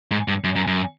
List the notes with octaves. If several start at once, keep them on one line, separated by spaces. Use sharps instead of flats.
G#2
G2
F#2
F#2
F#2